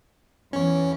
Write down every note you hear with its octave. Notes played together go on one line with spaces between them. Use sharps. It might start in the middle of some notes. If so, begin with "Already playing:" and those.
E2 E3 C#4 C#5